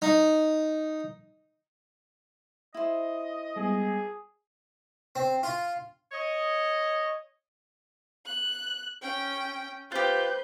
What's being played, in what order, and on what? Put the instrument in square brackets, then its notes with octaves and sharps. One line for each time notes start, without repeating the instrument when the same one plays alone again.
[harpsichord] D#4
[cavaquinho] E4 C5 [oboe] D#5
[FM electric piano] G3 G#3 B3 [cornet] G#4
[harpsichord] C4
F4
[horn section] C#5 D#5
[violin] F#6
[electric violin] C#4 [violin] G5
[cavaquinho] F4 G4 [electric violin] B4 G6 [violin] C5